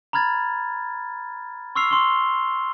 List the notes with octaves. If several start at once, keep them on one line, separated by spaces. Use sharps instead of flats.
A#5 B5 F6 G#6 A6
C6 C#6 E6 F6 C7 F7
C6 C#6 G7